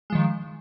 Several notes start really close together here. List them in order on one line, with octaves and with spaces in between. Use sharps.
G#3 F3 D#3